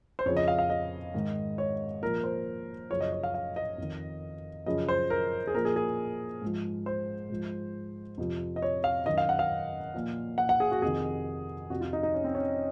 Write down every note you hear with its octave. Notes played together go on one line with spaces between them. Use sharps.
C5
F2 C#3 F3 C#5
D#5
F5
F5
D#5
G#2 D#3
C#5
A#2 F3 A#4
C5
F#2 C#3 F3 C#5
D#5
C#5
F5
F5
D#5
F2 D#3
F#2 C#3 F3 D#5
C5
A#4
G#4
A#2 F3 A#4
G#4
G#4
G#2 F3
C5
G#2 F3
F2 C3 F3
D#5
C#5
F5
F#2 D#3 D#5
F5
F#5
F5
A#2 F3
F#5
F#5
G#4
F#4
F2 C3 D#3 G#4
F2 C3 F3 F#4
F4
D#4
D#4
C#4
C4
C#4